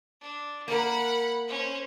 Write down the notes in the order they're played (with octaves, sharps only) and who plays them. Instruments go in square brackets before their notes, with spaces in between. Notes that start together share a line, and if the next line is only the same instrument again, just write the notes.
[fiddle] D4
[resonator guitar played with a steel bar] A#3 A#4 [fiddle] F#5 B5
[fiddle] C#4 C5